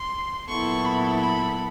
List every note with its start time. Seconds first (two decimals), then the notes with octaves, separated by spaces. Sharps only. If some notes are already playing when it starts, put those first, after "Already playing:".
Already playing: C6
0.49 A#2 F#3 B3 E4 A4 C#6
0.85 B5
1.21 B5